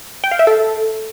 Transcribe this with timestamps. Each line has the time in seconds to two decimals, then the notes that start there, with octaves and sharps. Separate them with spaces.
0.24 G5
0.31 F5
0.39 E5
0.47 A4